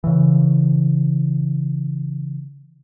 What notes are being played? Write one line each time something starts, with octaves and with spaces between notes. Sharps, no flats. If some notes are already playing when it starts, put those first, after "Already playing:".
C#3 E3